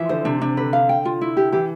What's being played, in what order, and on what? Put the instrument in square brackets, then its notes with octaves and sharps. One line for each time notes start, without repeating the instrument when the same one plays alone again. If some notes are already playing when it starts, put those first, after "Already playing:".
Already playing: [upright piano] E3 F3 [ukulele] E5
[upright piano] D3 [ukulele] C5
[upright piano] C3 [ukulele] D4
[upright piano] C3 [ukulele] D4
[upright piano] D3 [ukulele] B4
[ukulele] F5
G5
F4
E4
G4
[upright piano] E3 [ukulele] G4